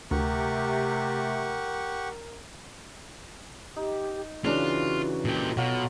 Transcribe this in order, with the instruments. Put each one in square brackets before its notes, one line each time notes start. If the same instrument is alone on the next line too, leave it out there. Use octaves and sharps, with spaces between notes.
[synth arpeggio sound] D2 [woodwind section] C3 A3 [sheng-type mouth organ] G4 F#5 C#6 [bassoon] A#4
[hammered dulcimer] D#4 [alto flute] G4
[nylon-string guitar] C#3 E3 D4 [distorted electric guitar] F4 [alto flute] F#4
[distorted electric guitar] A#2 G4 [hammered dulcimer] A4
[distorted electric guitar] B2 [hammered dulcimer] F#3 F4